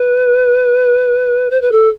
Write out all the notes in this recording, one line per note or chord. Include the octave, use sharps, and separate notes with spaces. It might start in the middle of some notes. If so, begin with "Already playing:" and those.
Already playing: B4
C5
B4
A4